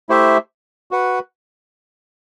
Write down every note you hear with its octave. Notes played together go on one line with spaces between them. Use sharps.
A3 E4 G4 C5 E5
F#4 B4 F#5